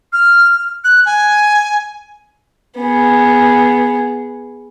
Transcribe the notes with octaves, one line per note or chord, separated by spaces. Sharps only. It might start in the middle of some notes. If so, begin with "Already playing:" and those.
F6
F#6
G#5
B3 G#4